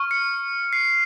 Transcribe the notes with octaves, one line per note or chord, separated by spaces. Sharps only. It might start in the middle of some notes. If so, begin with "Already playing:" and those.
Already playing: C#6 F6
C#7
C7